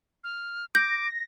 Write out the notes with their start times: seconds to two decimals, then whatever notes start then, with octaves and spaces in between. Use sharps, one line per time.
0.24 F6
0.75 D6 G6 A#6